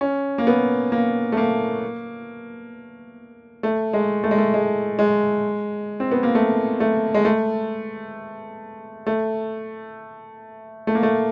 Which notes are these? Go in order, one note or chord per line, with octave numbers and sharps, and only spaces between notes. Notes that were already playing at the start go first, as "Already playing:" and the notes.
C#4
A#3
B3
A#3
A3
A#3
A3
G#3
A3
G#3
A3
G#3
G#3
C4
B3
A#3
A3
A3
G#3
A3
A3
A3
A#3
A3